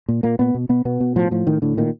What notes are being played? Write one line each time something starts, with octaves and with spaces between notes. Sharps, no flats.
A#2
A#2 A#3
A#2 B3
B2
B2 B3
B2 B3
B2
A2 F3
A2 F3
A2 D#3
A2 D3
A#2 D#3